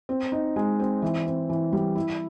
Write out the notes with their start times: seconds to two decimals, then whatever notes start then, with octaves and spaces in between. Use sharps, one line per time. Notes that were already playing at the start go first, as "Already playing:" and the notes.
0.09 C4
0.32 D#4
0.56 G#3
0.80 C4
1.02 E3
1.26 C4
1.50 E3
1.73 G3
1.95 E4